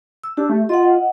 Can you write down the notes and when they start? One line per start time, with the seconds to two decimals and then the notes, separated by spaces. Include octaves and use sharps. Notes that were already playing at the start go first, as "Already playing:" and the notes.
0.23 E6
0.37 D4 G4
0.50 A3
0.69 F4 D#5 F#5